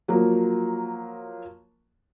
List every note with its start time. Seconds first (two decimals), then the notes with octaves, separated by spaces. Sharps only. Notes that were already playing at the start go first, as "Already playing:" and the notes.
0.08 F3 F#3 A#3